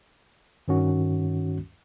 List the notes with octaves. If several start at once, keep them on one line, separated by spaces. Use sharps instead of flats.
G2 D#3 C#4 F#4